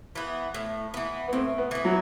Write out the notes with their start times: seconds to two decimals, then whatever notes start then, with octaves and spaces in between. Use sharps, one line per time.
0.15 E3 B3
0.54 A2
0.94 E3 B3
1.28 B3
1.33 A2 C4
1.58 B3
1.71 E3 B3
1.85 F#3